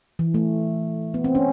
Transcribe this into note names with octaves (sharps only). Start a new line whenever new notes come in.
E3
A3
B3
C4
C#4